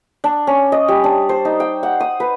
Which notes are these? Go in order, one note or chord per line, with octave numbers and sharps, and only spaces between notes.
D4
C#4
D#5
G3
D4
C5
D#4
G5
F#5
D#6
B4